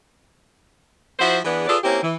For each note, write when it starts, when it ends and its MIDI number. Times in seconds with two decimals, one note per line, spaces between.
1.20 1.39 53
1.20 1.39 64
1.20 1.39 66
1.20 1.39 72
1.44 1.65 52
1.44 1.65 59
1.44 1.65 62
1.44 1.65 68
1.68 1.77 65
1.68 1.77 68
1.68 1.77 69
1.68 1.77 71
1.68 1.77 74
1.83 2.01 58
1.83 2.01 60
1.83 2.01 61
1.83 2.01 64
1.83 2.01 67
2.03 2.15 52